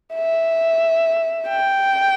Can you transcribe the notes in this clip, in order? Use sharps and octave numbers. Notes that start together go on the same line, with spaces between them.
E5
G5